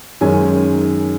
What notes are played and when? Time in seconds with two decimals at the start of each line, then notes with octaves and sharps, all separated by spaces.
0.21 F#2 D#3 G#3 C#4 G#5